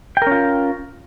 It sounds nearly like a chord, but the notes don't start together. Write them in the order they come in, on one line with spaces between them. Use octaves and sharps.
G5 A#4 C#4 F4